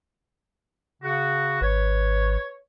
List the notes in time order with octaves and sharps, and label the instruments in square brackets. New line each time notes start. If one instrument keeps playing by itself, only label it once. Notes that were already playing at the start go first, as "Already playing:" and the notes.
[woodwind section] C#3 F#4
[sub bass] G#1 [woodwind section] B4 C#5